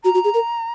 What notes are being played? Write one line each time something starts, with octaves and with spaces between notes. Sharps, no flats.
F#4 A#5
F#4
G#4
A#4